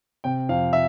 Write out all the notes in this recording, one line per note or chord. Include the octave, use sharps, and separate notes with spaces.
C3 G5
F2 F5
E5